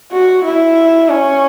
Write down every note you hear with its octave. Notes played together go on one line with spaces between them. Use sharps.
F#4
E4
C#4